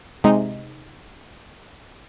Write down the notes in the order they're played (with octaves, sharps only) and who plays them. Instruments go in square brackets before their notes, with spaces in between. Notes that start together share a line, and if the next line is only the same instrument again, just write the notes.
[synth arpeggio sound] C3 G#3 D#4